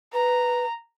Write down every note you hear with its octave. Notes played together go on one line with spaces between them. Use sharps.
B4 A#5